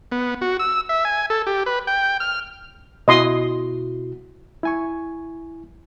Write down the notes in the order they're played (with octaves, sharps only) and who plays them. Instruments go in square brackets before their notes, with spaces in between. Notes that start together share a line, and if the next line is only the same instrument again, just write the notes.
[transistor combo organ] B3
F#4
E6
E5
G#5
A4
G4
B4
G5
F6
[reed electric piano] B2 E4 F#4 [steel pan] D#5 C6 D#6
[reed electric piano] E4 G#5 C#6